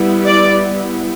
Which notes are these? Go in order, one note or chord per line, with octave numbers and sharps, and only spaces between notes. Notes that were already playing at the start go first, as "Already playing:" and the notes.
Already playing: G3 B3 E4
D5